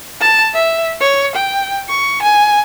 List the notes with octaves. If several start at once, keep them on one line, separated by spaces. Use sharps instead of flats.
A5
E5
C#5
G5
C#6
G#5